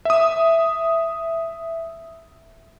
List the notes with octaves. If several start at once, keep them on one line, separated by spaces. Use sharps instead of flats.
E5 D#6